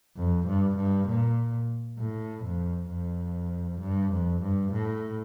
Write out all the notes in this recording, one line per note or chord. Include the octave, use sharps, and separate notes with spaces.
F2
G2
G2
A#2
A2
F2
F2
G2
F2
G2
A2